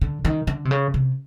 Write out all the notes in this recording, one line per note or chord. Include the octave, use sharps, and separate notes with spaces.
D3
D#3
D3
C3
C#3
C3